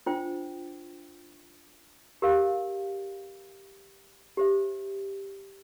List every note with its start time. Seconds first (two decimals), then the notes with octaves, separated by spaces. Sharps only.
0.06 D4 F4 C5 G5
2.22 G4 A#4 F5
4.37 G4 C5 E5